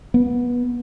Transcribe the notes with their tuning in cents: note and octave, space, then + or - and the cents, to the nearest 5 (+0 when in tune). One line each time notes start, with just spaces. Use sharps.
B3 -20